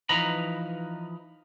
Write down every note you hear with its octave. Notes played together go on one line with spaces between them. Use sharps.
E3 F3 D#4 B4 A#5 B5